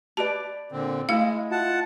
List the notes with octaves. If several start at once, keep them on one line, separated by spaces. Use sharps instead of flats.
G4 B4 D5 A5
A#2 D3 C4
G#3 A3 E4 D#5 F5
F4 F#5 A5